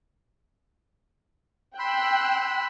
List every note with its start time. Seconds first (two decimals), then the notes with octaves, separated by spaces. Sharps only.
1.79 G5 B5 C6 E6 F#6